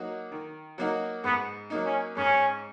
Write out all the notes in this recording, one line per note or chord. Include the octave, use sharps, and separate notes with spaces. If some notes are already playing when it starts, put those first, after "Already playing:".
Already playing: F#3 A#3 D#4 F#4
D#3
F#3 A#3 D#4 F#4
G#2 B3
F#3 A#3 D#4
C#4
G#2 C#4